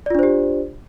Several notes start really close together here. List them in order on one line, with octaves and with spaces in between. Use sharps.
D5 F4 D4 C5 G4